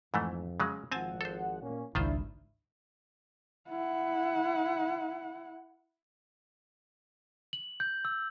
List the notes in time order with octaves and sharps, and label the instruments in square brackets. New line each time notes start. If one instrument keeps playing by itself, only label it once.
[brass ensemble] F2 [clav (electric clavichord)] G#2 E3 A3
[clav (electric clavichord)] C#3 F#3 G#3
[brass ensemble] G#1 F3 F#5 [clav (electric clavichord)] C4 G#5 A5
[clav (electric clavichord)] A4 C5
[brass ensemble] A#2 A#3 C#4
[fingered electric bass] G#1 C#2 [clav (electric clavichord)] D#3 F4 C5 [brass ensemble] D4 E4
[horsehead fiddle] E4 F#5
[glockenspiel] F#7
G6
E6